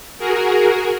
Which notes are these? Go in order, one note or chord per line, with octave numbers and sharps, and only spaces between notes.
F#4 G#4 A#4